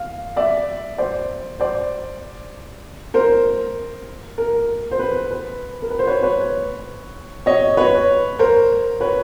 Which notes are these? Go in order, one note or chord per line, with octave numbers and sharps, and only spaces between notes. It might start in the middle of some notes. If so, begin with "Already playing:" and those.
Already playing: F5
D5 E5
C5 D5
C5 D5
A#4 C5
A#4
C5
B4
B4
A#4
B4
C5
B4 C#5
B4 C#5
C#5 D#5
B4 C#5
A#4 C5
B4 C#5